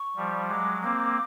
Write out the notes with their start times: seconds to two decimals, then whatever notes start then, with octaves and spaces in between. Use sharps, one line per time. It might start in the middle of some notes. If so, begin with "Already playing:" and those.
Already playing: C#6
0.16 F3 G3
0.48 F#3 G#3 D6
0.82 A#3 C4 D6